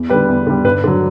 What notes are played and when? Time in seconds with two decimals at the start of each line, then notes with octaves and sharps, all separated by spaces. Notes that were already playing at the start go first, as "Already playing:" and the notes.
Already playing: E2
0.09 D3 G3 B4
0.28 E2
0.47 D3 G3
0.64 G2 B4
0.84 D3 F#3